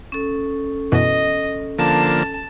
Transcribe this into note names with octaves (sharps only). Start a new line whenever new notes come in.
C#4 A4
F#2 B2 E3 D#5
D3 F3 A#3 A5